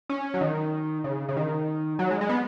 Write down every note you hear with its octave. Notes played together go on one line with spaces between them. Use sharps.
C#4
F#3
D#3
C#3
C#3
D#3
F#3
G#3
G#3
B3